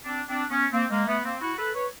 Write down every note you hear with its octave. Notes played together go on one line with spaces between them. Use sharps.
C4 D4
C4 D4
B3 C#4
A#3 C4
G#3 A#3
A3 B3
A#3 C4
E4 F#4
A4 B4
B4 C#5